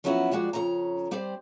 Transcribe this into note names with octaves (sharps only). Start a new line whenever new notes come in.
F3 F#3 B3 C#4 E4 F#4
F3 G3 G#3 F#4 D5
F2 C#3 C#4 A#5
G3 C4 G4 C5 D5